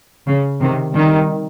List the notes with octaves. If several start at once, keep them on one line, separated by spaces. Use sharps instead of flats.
C#3
C3 D#3
D#3 G3